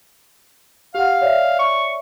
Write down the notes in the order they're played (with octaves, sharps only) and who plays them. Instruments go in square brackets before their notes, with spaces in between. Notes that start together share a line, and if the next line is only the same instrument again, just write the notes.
[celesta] G4 F#5 [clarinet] F5
[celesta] C#5 D5 E5
[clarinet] C#6